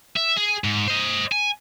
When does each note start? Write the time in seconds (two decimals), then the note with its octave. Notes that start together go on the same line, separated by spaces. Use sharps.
0.17 E5
0.37 G#4
0.64 G#2
0.88 C5 D#5
1.32 G#5